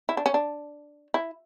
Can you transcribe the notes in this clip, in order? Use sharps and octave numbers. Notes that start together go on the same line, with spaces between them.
E4
D4
C#4
D4
E4